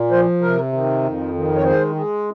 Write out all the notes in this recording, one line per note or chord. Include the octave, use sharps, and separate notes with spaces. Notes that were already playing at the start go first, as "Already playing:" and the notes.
Already playing: A#2
F3 C5
C3 A#4
D#3
F2
D#3
C#5
G#3 C5
G#3